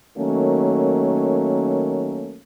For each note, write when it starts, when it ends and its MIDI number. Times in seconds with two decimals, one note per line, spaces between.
0.17 2.40 51
0.17 2.40 54
0.17 2.40 57
0.17 2.40 58
0.17 2.40 61